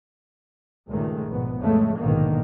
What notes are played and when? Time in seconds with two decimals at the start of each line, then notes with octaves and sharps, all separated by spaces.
0.89 C#2 G2 A#2 D#3 G#3 A3
1.28 A#1 G#2 B2 B3
1.59 F2 A2 C#3 G#3 A3
1.97 A#1 G#2 B2 D3 D#3 A#3